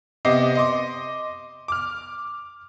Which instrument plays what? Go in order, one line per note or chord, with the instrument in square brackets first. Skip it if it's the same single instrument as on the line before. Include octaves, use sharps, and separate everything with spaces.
[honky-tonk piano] C3 B3 D#5 D6 C7
D#5 C6 D6
D6 F6